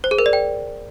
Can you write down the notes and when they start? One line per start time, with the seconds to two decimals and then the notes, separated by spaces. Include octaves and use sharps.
0.04 C5
0.11 G#4
0.18 A#4
0.26 D5
0.33 G5